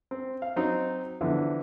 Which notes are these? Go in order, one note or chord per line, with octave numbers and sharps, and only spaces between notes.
C4
F5
F#3 C4 D#4
E2 D3 E3 F3